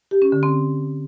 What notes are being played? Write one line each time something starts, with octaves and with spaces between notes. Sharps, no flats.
G4
C#4
D3
C4